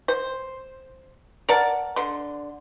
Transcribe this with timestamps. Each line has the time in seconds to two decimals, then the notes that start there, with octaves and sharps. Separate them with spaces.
0.08 C5
1.49 A#4 D5 F#5 A5
1.96 D3 C6